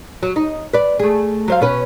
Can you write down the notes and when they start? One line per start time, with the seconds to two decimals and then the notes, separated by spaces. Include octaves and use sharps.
0.23 F#3
0.36 D#4
0.73 B4 D5
0.99 A3 G#4
1.48 F#3 C5 F5
1.61 B2 C#4 B4